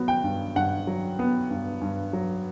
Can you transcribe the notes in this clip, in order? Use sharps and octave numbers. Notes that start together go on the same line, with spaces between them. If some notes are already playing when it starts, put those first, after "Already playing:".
Already playing: F#3 B3
G5
G2
G2 F#5
F#3
B3
G2
G2
F#3